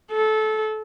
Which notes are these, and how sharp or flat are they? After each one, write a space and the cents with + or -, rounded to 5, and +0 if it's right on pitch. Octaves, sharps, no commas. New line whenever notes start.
A4 -20